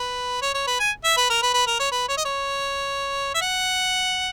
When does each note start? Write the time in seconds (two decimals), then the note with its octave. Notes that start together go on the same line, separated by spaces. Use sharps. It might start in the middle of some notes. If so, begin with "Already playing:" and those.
Already playing: B4
0.42 C#5
0.54 C#5
0.67 B4
0.80 G#5
1.04 E5
1.17 B4
1.30 A#4
1.42 B4
1.54 B4
1.67 A#4
1.79 C#5
1.92 B4
2.08 C#5
2.17 D#5
2.25 C#5
3.35 E5
3.41 F#5